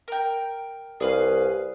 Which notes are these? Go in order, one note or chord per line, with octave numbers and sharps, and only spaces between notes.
A#4 G5
C2 G#4 B4 F5